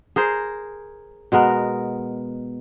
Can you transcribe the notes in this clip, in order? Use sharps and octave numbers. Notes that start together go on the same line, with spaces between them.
G#4 A#4 C5
B2 G#3 B3 A#4